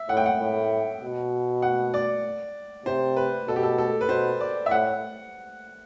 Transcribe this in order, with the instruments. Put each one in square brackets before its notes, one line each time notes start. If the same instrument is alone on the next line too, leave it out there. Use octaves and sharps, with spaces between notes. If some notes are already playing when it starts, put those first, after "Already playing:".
Already playing: [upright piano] E5
[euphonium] A2 [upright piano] F#5
[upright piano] G5
F#5
[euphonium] A2
B2
[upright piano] F#5
D5
[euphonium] C3 [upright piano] C5
[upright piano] B4
[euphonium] B2 [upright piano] A4
[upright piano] G4
A4
A4
B4
[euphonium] B2 [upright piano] C5
[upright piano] D5
E5
[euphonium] A2 [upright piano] F#5